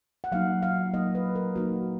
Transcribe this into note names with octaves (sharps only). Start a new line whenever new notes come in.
F#5
F#3 A#3 D#4 F5
F5
F#3 A#3 D#4 D#5
B4
A#4
F#3 A#3 D#4 F#4